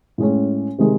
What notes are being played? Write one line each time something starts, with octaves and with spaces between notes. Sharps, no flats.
A2 G#3 C#4
C3 D#3 G#3 D#4